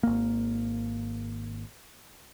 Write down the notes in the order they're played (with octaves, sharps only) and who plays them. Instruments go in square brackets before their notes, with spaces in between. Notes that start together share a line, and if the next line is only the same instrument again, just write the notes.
[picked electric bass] G#1 A#3